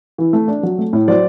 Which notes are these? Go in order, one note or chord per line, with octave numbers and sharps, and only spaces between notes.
E3
A3
D4
F#3
A3
A2
F#3 C5 D5